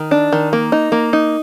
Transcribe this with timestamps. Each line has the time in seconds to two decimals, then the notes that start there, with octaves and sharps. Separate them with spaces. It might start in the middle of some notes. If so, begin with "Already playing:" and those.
Already playing: D#3
0.11 D4
0.32 D#3
0.53 A#3
0.72 D#4
0.92 A#3
1.13 D#4